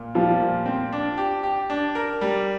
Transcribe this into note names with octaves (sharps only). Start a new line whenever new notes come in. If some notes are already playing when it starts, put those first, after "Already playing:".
Already playing: A#2
F3 G3
A#2
C4
D4
G4
G4
D4
A#4
G3